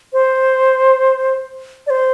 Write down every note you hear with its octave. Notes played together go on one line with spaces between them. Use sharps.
C5
D5
C5